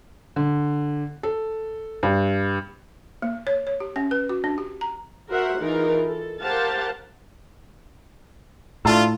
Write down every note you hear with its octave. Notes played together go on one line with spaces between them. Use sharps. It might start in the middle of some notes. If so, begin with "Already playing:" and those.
D3
A4
G2
A#3
C#5
C#5
G4
C#4
B4
F#4
D4
G4
A#5
F#4 A#4 C5 E5 F#5
E3 D#4 F4 G#4 A#4
A4
G4 A#4 C5 F5 F#5 A5
A2 A3 D4 F4 A5 E6